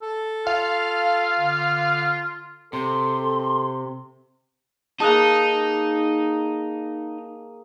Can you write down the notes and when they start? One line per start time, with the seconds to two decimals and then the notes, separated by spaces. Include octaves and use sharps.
0.02 A4
0.47 F4 F5
1.39 D3
2.73 C3 A4 C6
5.00 A#3 D#4 G#4 A5 D#6 F#6